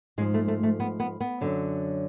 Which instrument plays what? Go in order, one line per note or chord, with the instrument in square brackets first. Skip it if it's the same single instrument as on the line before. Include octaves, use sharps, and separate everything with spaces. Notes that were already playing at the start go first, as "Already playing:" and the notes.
[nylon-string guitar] G#2 G#3
F3
A3
A3
A3
B3
B3
B3
F#2 D3 F#3